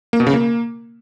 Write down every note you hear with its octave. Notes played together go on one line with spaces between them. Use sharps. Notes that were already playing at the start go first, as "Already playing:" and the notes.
A#3
B2
C#3
A#3